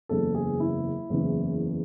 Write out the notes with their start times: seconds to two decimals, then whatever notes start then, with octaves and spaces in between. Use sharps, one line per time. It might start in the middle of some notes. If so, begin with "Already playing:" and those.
0.09 F#1 E2 C#3 E3 A4
0.35 G#4
0.60 E4
1.09 F#1 E2 C#3 E3